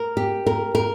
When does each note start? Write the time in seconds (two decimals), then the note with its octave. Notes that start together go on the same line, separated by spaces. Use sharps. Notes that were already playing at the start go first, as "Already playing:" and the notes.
Already playing: A#4
0.17 G4
0.46 A#4
0.75 A#4